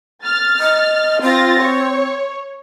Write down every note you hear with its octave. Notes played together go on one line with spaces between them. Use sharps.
F6 A6
D#5
C4 F4 A6 A#6
C#5